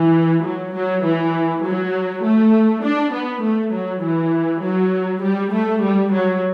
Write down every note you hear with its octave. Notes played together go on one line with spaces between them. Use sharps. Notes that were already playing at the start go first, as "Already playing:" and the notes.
Already playing: E3
F#3
F#3
E3
F#3
A3
D4
B3
A3
F#3
E3
F#3
G3
A3
G3
F#3